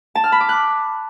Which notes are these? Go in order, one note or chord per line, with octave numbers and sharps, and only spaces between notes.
A5
F6
B5
D6
F#6